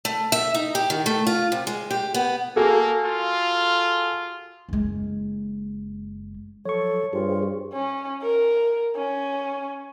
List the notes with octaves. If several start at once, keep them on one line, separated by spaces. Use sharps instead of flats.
A3
E5
D#4
G4
D#3
A3
F4
C3
G#3
G4
B3
A#3 F#4 G#4 A4
F4
F#1 G#3
F3 F#3 A4 C#5 C#6
G2 F4 G4 G#4 C5
C#4
A#4
C#4